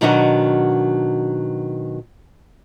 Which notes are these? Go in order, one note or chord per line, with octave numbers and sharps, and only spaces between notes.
B2 D#3 F#3 D4 F#4 D#5